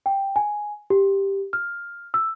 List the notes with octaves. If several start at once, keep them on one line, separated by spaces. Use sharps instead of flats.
G5
G#5
G4
F6
E6